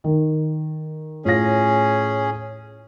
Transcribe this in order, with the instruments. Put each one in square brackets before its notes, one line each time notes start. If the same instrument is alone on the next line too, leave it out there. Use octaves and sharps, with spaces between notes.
[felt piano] D#3
[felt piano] A2 F4 A#6 [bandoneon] C#4 G#4